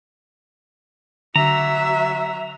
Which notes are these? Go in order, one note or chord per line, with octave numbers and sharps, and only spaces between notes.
D3 F#3 E5 A#5